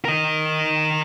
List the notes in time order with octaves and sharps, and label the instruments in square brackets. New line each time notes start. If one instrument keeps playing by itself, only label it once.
[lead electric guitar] A#4 D#5